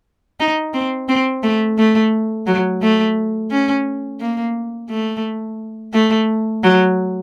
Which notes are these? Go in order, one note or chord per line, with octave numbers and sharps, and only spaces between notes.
D#4
C4
C4
A3
A3
F#3
A3
C#4
A#3
A3
A3
F#3